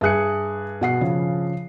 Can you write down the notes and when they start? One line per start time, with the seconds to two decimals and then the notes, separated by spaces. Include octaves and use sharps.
0.01 G2 G#4 E5 F#6 C#7
0.81 B2 F#5 C7
1.01 C#3 F3